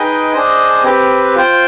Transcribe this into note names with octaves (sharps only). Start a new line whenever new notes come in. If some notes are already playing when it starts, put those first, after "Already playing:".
Already playing: D#4 G#4 B4 D#5 G5
D4 G#4 C5 D#5
C4 G4 B4
F4 C5 G5